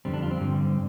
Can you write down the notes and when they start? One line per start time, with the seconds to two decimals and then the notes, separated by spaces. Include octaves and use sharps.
0.05 F2 D3 G3 C4
0.14 D4
0.22 F4
0.31 C4
0.41 G2 D3 G3